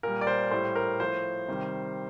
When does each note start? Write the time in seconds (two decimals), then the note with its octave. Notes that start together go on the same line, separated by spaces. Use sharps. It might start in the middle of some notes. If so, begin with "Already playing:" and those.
0.03 A#2 G3 A#4
0.21 D5
0.27 C5
0.51 A2 G3 C5
0.75 A#4
1.00 A2 F3 C5
1.48 C3 D#3 G3